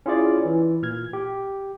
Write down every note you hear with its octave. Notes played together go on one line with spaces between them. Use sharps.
C#4 E4 F4 G#4 C#5 D5
E3
A#2 F6 G#6
G4